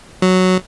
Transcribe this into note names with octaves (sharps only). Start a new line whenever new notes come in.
F#3